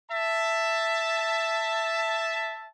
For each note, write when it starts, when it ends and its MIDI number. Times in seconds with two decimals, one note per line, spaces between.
0.11 2.67 76
0.11 2.67 81